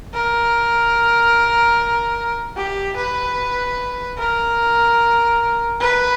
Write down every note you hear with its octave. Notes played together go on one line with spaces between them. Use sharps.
A#4
G4
B4
A#4
B4